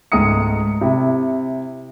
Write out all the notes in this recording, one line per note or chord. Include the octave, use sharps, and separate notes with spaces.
C#2 G#2 A3 A#5 D#6 C#7
C3 E4